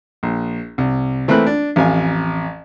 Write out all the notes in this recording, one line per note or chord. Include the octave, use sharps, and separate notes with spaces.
A#1
C2
E3 A3 A#3 C4 B5 F#6
D4
A1 F2 F5 G#5